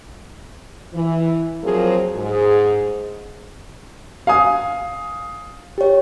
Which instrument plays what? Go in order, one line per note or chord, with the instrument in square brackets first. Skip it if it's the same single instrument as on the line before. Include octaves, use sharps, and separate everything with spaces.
[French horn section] E3
F3 F#3 A#3 C4 G#4
G#2 G#4
[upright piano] F5 G#5 D#6
[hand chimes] G4 C#5